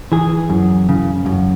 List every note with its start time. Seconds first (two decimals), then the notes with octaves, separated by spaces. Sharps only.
0.12 E3 G#4
0.50 F#2
0.89 C#3
1.26 F#2